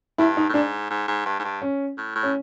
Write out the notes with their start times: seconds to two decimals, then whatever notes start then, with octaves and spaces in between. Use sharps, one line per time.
0.18 G2 E4
0.37 D#4
0.49 A2
0.54 G#2 D4
0.90 G#2
1.08 G#2
1.25 G2
1.39 G#2
1.44 G2
1.62 C#4
1.98 A2
2.15 A2
2.23 C#4